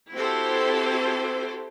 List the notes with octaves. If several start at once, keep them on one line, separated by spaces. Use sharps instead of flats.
C4 E4 F#4 G4 A4 C5